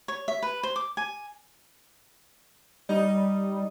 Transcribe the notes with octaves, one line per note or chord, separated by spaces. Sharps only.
C#5
E5
B4
C5
D6
G#5
G3 D#4